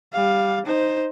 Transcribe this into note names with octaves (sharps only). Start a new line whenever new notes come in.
G3 F5
D#4 C5